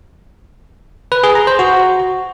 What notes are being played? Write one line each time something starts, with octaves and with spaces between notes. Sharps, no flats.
B4
G#4
A#5
C5
F#4